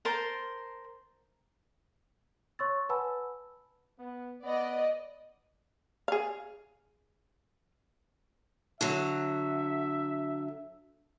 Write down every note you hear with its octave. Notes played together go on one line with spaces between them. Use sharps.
A#4 C5 A5 C6
C#5 C6 C#6 E6 A6
B4 F#5 G#5 A5 B5 E6
B3
B3 D5 D#5
G#4 F5
D3 F#3 E5